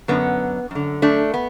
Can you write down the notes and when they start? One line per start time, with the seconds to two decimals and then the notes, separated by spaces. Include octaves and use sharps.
0.08 F#2 D3 B3
0.71 F#2 D3
1.02 A3 D4
1.34 B3